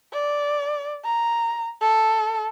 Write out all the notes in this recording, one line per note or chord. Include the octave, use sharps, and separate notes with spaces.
D5
A#5
A4